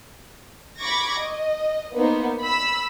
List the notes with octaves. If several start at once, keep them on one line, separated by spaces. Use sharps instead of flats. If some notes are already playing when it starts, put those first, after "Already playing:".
B5 C#6 D6 G#6 A#6
D#5
A#3 B3 D#4 C5
B5 E6